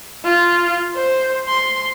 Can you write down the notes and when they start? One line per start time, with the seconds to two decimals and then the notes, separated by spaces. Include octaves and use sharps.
0.25 F4
0.96 C5
1.48 C6